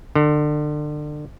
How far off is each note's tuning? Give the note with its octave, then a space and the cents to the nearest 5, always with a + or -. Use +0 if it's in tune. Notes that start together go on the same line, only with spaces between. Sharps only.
D3 +30